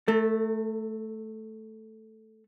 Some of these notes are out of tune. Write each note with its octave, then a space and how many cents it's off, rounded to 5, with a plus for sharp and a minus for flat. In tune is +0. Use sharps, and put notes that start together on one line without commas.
A3 -5 A4 +40